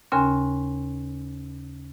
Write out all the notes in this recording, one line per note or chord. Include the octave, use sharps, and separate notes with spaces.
D#2 C#3 C#4 A#4 G#5 C6